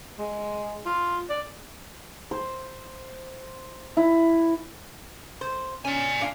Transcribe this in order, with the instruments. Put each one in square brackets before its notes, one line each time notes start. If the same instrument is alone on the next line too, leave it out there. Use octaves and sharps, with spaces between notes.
[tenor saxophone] G#3
F4
D5
[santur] C5
E4
[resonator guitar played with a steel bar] C5
[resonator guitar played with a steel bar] C#4 [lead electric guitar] D5 G#5
[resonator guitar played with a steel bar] A#2 D4 F5